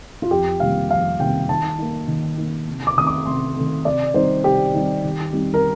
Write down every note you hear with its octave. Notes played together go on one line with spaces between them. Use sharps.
F4
F2 G4
C3 D#3 G3 A#3 F5
F2 F5
C3 D#3 G3 A#3 G5
D#3 A5
A#3 D#4
D#3
A#3 D#4
C3
D6
D#3 A3 C4 D#6
D6
C3 C6
D#3 A3 C4
C3 D5
D#3 G3 C4 D#4 C5
C3 G4
D#3 G3 C4 D#4
D#3
G3 C4 D#4
A#4